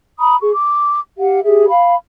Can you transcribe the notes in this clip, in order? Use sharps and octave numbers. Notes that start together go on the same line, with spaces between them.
A#5 B5 D#6
G#4 C#6
D6
G4 F5 F#5
G4 G#4 E5
F5 B5